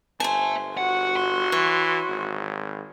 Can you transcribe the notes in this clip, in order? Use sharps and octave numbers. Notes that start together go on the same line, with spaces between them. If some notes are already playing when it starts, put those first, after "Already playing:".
G1 C5 E5 G#5 A5
F#4 F#5
C6
E3 C#5
G#1